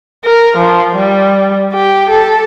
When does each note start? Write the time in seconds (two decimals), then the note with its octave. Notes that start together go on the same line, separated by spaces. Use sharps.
0.24 A#4
0.57 F3
0.96 G3
1.73 G4
2.10 A4